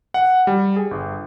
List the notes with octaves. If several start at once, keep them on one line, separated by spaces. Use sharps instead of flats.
F#5
G3
G#4
G1